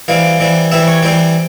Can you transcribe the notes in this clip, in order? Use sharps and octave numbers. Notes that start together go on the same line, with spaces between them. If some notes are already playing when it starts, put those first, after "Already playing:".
E3 G3 C4 F5
E3 G3 C4
E3 G3 C4 E5
C#5
E3 G3 C4 C5